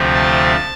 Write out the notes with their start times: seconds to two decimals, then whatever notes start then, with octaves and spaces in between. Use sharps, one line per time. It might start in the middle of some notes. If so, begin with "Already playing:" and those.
Already playing: D2 C3 F3 A3 C4
0.14 A5